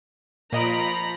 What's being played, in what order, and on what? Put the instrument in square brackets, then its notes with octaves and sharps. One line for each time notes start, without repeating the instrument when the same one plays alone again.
[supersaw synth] A#2 D#5 D7 [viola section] F3 A#5 B5